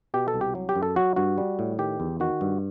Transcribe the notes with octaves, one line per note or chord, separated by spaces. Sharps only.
B2 G4
A4
C2
G4
F#3
G4
F#2
A4
F#3 F#4
G2 F#4
G3
A2
D#3 G4
E2
D#3 F#4
G2